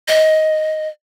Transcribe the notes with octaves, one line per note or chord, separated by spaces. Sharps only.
D#5